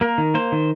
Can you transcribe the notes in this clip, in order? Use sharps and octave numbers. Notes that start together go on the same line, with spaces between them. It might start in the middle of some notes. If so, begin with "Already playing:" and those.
A#3 A#4
D#3
A#3 C5
D#3